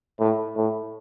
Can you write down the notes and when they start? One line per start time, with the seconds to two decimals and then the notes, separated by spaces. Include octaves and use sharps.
0.19 A2
0.56 A2